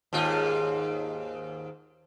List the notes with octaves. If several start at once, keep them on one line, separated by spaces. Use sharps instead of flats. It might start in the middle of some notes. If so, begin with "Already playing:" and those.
D#2 G#2 F4